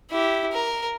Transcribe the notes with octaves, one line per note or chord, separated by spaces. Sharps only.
E4 G4
A#4